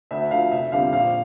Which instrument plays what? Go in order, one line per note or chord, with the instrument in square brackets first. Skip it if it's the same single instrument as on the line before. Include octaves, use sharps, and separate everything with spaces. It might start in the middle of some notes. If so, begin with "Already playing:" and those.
[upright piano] D2 E5
D3 F3 F5
F1 E5
F2 D3 G3 C4 F5
A#1 F5